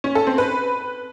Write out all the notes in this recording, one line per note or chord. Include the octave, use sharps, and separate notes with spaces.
C#4
A4
C4
B4